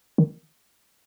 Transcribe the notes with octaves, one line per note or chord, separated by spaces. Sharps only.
D#3